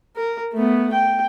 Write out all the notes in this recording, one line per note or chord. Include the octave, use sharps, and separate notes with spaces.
A#4
A3 B3
G5